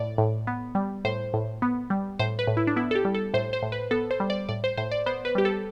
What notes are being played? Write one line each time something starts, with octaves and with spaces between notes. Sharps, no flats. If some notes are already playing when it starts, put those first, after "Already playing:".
Already playing: A2 D5
A2
B3
G3
A2 C5
A2
B3
G3
A2 C5
B4
A2
E4
D4
B3 E4
A4
G4
G3
A4
A2 C5
C5
A2
B4
B3 A4
C5
G3
D5
A2 D5
C5
A2 C5
D5
B3 C5
B4
G3 G4
A4